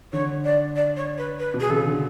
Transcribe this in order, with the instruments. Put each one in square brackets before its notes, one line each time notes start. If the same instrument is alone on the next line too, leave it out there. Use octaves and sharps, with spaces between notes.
[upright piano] D3 [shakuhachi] C#5
[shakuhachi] D5
D5
C#5
B4
B4
[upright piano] B2
[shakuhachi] G#4
[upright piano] C#3 [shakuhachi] A4
[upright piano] D3